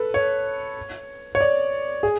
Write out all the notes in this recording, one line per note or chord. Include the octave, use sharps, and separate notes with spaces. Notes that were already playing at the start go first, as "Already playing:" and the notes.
Already playing: A4 B4
C#5
C#5
D5
G#4